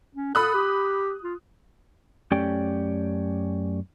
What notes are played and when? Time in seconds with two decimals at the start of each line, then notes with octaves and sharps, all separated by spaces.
0.15 C#4
0.35 A4 B5 D#6 F#6
0.54 G4
1.23 F4
2.32 F#2 A3 C#4 G4 D5 G5